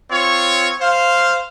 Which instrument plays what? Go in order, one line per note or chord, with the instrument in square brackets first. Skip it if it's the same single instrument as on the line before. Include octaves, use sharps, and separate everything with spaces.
[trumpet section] C4 F4 C#5
C5 F5